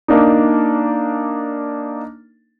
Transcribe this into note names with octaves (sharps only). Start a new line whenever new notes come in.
A#3 D4 D#4